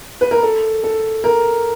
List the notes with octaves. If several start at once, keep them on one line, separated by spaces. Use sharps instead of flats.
B4
A#4
A4
A4
A#4